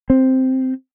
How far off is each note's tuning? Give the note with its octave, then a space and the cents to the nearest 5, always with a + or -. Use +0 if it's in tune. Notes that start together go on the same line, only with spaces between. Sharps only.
C4 +0